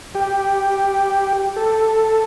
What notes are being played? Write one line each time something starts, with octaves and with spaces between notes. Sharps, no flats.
G4
A4